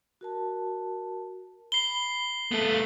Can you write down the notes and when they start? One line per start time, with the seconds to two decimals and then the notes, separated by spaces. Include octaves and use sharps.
0.21 F#4 A#4 A5
1.72 B5 C7 G7
2.51 A3 B3 A4 F5